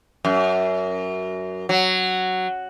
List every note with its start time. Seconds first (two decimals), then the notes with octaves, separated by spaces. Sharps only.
0.25 F#2
1.69 F#3